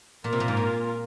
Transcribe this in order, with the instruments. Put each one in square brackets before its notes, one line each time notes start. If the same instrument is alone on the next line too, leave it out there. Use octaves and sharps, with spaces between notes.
[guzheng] A#2 [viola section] A#3 F4 A#4
[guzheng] C3
A#2
G#2
A#2